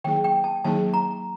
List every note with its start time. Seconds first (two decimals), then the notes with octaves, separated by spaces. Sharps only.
0.04 D#3 F#3 A#3 D#4 G#4 G5
0.24 G5
0.44 A5
0.65 D#3 F#3 A#3 D#4 G#4 A5
0.94 A#5